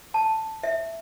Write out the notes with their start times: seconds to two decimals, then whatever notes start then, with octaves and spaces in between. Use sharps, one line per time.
0.14 A5
0.63 E5